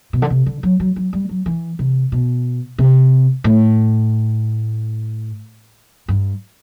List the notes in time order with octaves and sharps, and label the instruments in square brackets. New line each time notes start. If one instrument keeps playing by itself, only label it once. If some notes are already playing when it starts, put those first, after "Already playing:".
[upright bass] B2
D3
C3
D3
F#3
F#3
F#3
G3
F#3
E3
C3
B2
C3
A2
G2